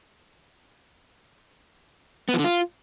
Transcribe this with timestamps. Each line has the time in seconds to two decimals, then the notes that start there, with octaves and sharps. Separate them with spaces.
2.29 B3
2.34 F3
2.39 D3
2.44 F4